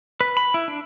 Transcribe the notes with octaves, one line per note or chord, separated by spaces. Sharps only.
B4
B5
E4
D4